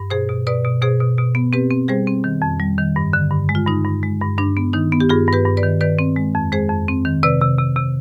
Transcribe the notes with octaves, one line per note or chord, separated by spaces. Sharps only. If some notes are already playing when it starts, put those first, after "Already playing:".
Already playing: G2
B2 G#4 C5
B2
B2 B4 D5
B2
B2 G#4 C5
B2
B2
B3
C4 G4 B4
C4
G3 G#4 C5
C4
D#3
F2
G3
D#3
G2
D3
G2
G#3
F4
G2 D#4
G2
G#3
G2
G2 D4
B3
D#3 D#4
B3
G4
G2 F4 G#4
G2
G4 B4
G2
B4 D5
D#3
D#3 B4 D5
C4
G#3
F2
G#3 G#4 C5
F2
C4
D#3
C3 B4 D5
C3
C3
C3